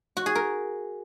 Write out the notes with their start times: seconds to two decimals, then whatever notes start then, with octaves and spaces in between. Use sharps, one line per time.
0.17 F#4
0.26 G#4
0.35 A#4